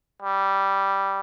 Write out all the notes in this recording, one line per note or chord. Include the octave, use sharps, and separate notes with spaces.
G3